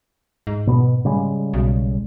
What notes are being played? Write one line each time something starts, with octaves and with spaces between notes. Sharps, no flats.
G#2
B2 B3
C#3 G3 G#3
B1